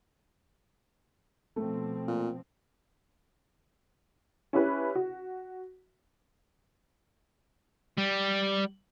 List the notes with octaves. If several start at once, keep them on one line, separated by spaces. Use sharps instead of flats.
B2 F3 A3 C4
A#2
C#4 E4 G4 B4
F#4
G3